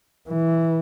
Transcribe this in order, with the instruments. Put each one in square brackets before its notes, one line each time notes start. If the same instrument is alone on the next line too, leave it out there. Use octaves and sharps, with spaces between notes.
[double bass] E3